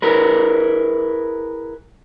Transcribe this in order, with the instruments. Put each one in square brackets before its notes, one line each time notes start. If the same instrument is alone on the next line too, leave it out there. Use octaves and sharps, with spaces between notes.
[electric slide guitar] E4 G#4 A#4 B4